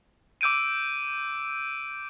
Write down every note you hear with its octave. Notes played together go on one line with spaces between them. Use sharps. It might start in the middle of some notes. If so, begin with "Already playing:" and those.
D6 E6 G6 D7 D#7